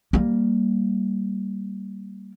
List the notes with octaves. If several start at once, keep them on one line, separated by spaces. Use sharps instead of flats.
G3 A#3